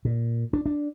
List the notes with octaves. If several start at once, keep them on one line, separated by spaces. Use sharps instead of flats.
A#2
D4
D4